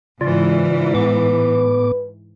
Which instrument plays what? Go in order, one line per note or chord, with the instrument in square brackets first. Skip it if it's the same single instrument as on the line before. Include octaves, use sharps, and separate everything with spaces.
[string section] G#2 E3 [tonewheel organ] C#3 F4 D5
[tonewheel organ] A2 B3 D6 [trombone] B4